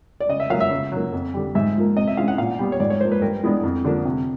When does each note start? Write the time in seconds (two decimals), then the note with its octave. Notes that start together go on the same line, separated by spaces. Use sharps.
0.20 D5
0.29 C#3 D#5
0.40 E5
0.50 F#3 A#3 F5
0.60 E5
0.71 C#3
0.92 F#3 A#3
1.12 F2
1.34 D3 G3
1.55 G#2 E5
1.76 F3 A#3
1.96 C3 D#5
2.07 E5
2.17 E3 G#3 C#4 F5
2.28 F#5
2.38 A#2 F5
2.59 G3 B3
2.72 C#5
2.80 G#2 D5
2.90 C#5
3.01 F3 A#3 C5
3.12 B4
3.22 G2 A#4
3.43 E3 G#3 B3 D4
3.63 F2
3.85 D3 F3 A#3 D4
4.05 C3